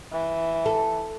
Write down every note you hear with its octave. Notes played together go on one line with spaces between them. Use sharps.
E3
A4